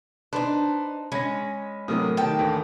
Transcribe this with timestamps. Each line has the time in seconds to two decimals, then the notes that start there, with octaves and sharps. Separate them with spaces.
0.33 D4 D#4 B4 C5
1.12 G#3 C#4 B5 A#6
1.88 A2 C3 F#3 A#4 D#6
2.17 D#3 G4 G5 A5
2.39 D#2 D3 E3